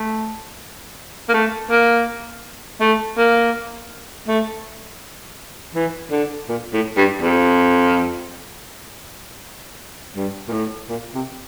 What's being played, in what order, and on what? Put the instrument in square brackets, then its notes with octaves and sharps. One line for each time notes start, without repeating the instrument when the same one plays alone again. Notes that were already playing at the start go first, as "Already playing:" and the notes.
Already playing: [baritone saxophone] A3
A#3
A3
A#3
A3
A#3
A3
E3
D3
A#2
A2
G2
F2
G2
A#2
A2
A#2
C3